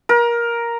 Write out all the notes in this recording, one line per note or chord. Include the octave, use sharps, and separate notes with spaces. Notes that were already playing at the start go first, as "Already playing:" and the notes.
A#4